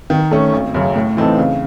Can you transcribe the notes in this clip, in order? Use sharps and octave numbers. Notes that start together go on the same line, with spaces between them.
D#3
A3 C#4
G#1
F#2 C#3
A2
E3 C4 D#4 A4
C#3